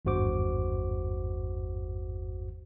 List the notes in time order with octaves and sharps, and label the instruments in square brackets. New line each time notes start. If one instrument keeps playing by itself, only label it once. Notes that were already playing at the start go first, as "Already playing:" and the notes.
[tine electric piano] G#1 E2 G2 F#4 C5 D6